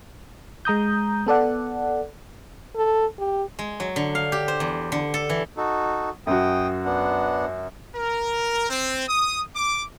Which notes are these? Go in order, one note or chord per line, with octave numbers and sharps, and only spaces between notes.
G#3 A#5 D#6 G6
B3 A4 D5 F#5
A4
G4
G#3
F#3
D3
F5
G4
C5
E2
D3
A4
E3
D#4 F#4 A4
F#2 F#4 G5 D#6
B3 D4 F#5
A#4
C4
D#6
D6